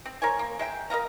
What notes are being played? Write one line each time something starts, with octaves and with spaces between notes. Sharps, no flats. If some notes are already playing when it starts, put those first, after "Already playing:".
C4
A#4 C5 C#5 G#5
A#3
G#3 E5 G5
A#4 D#5 F5 A#5